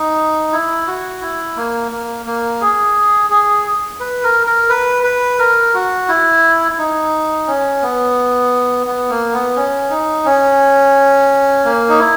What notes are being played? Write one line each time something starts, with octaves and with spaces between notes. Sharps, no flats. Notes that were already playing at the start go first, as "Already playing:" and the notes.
Already playing: D#4
E4
F#4
E4
A#3
A#3
A#3
G#4
G#4
B4
A#4
A#4
B4
B4
A#4
F#4
E4
E4
D#4
C#4
B3
B3
A#3
B3
C#4
D#4
C#4
A#3
D#4
E4